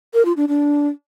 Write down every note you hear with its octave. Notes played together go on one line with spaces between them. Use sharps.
A#4
F4
D4
D4